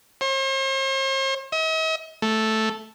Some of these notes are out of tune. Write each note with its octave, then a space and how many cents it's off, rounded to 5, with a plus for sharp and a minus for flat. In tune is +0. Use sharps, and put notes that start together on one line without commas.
C5 +45
D#5 +45
A3 +0